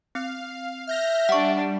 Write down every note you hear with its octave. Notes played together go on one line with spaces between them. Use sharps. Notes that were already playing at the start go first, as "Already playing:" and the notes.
C4 F5
E5 F6 G6 A#6
G3 D4 D5 F#5 C#6